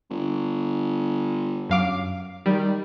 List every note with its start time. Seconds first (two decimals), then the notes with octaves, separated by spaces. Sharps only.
0.10 G1
1.69 F#2 F5 D6
2.46 D#3 G3